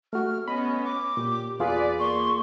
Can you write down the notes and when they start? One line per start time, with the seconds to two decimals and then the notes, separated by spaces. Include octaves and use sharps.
0.13 A3 F#4 F6
0.48 B3 C#4 D#5 B5
0.85 D6
1.17 A#2 G4
1.60 E2 F4 G#4 B4 D5
2.00 A#3 C6 C#6